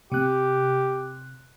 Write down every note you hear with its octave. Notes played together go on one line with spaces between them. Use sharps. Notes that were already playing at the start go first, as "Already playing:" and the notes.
C3 G4 F#6